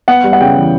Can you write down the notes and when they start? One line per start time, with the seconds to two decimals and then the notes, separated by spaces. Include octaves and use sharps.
0.08 B3 F#5
0.24 G3
0.33 F#5
0.41 C#3 G5
0.56 E3